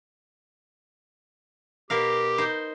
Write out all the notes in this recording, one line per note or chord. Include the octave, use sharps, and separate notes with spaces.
B2 G4 A#4 F5
D#4 C5